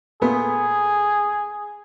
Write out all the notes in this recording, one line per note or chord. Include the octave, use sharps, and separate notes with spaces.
A#2 A3 B3 G#4